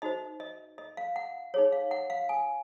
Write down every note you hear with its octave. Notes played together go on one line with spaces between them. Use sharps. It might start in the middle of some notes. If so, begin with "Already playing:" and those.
D#4 F#4 C5 D#5
D#5
D#5
F5
F#5
D#4 G#4 C#5
F5
F#5
F5
G#5